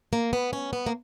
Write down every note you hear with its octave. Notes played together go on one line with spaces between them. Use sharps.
A#3
B3
C#4
B3
A#3